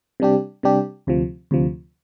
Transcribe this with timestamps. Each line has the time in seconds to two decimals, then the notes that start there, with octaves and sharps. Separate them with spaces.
0.20 C3 G3 D4 G4
0.63 C3 G3 D4 G4
1.07 D2 C3 F3
1.51 D2 C3 F3